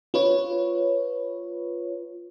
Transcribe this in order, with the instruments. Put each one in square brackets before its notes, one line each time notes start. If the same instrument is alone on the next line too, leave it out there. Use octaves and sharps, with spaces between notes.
[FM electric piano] F4 B4 C#5